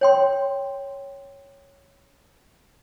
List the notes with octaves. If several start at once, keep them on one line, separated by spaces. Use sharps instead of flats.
C#5 G5 C6